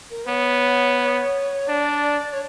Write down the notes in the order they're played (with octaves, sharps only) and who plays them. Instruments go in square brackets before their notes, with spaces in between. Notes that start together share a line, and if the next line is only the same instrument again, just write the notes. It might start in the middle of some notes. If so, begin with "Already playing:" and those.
[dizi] A#4
[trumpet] B3 [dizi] C#5
[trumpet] D4 [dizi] D5
[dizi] C#5